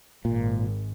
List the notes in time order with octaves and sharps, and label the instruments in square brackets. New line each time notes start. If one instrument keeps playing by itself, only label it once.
[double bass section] G#1 [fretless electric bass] A#2